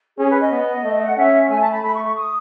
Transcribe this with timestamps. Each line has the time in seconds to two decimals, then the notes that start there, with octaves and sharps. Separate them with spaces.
0.18 C#4 G#4
0.30 B4
0.40 D#5
0.51 B3
0.84 A3
1.05 F#5
1.17 C#4 E5
1.49 A3 G#5
1.60 A5
1.71 B5
1.83 A3 B5
1.94 C#6
2.04 C#6
2.15 D#6